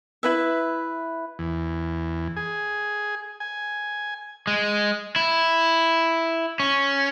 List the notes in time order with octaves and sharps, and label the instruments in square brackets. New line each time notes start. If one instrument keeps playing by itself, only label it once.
[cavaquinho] E4 B4 E5
[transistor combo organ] E2
G#4
G#5
[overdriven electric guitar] G#3
E4
C#4